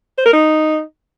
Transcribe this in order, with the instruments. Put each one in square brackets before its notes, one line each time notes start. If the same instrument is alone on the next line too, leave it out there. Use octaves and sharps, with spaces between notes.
[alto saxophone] C5
A#4
D#4